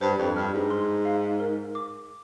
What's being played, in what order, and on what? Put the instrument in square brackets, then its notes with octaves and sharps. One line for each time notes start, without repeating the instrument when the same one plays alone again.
[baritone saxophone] G2 [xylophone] C5
[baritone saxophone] F2
[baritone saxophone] G2 [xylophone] F6
[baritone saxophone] G#2
[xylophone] C6
F5
A#4
D6